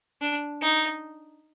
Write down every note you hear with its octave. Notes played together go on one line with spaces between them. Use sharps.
D4
D#4